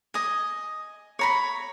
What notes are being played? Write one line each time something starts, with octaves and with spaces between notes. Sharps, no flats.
D#5 G#5
C#5 A#5 B5